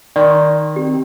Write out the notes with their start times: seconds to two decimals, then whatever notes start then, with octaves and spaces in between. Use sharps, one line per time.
0.16 D#3 D5 C6 C#6
0.76 C4 G4